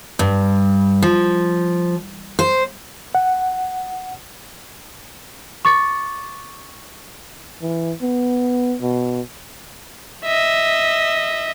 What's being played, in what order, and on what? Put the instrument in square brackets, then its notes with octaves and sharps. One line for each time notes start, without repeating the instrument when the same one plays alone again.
[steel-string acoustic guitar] G2
F3
C5
[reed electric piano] F#5
[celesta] C#6 D6 A6 C#7
[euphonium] E3
B3
B2
[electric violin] D#5 E5